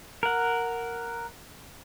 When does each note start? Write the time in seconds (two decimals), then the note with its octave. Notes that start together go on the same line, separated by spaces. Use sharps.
0.23 A#4 F#5